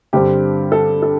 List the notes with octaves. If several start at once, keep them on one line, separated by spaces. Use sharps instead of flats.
G2 D3 G3 C4 G4
A4
A4